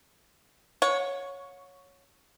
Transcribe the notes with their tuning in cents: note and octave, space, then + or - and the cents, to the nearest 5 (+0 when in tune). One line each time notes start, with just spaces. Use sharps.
C#5 +0 F#5 -40